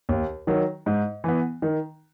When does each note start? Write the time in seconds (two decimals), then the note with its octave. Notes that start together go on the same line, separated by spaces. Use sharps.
0.09 D#2
0.47 D#3 F#3
0.86 G#2
1.24 E3 B3
1.62 D#3